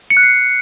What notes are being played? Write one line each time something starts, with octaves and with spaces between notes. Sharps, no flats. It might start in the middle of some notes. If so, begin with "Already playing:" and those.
C#7
F#6
C7